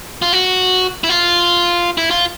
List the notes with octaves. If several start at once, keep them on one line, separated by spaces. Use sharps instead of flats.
F4
F#4
E4
F4
E4
F4